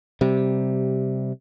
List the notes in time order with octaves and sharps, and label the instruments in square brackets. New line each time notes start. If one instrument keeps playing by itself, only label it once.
[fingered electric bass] C3 G3